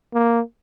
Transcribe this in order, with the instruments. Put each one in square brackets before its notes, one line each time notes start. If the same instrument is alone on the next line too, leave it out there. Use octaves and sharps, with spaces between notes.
[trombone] A#3